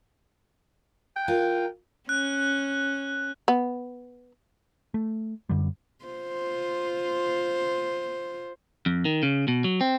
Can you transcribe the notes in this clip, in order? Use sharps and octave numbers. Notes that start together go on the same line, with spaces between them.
G5
F4 A#4
C#4 F#6
B3
A3
F#2 D3 G3
F4 C5
F2
D#3
C#3
B2
F#3
C4